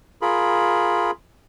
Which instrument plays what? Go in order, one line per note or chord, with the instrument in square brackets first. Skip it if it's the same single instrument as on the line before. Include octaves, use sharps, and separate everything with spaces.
[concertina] F4 G#4 A#4 B5